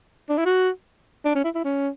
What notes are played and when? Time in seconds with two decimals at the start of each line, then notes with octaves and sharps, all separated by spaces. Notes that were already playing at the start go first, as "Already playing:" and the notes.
0.29 D4
0.38 E4
0.45 F#4
1.25 D4
1.35 C#4
1.44 E4
1.55 E4
1.65 C#4